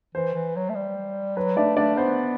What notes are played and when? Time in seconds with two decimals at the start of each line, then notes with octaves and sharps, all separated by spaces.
0.15 E3 C5
0.34 E3
0.56 F#3
0.69 A3
0.75 G3
1.36 F#3 B4
1.57 A3 D4 D5
1.77 A3 D4 D5
1.97 B3 C5